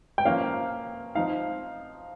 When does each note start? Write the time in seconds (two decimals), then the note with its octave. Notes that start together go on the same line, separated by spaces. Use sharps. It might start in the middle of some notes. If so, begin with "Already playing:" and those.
0.18 G5
0.25 F3 A#3 C#4 F5
1.15 F3 C4 D#4 F5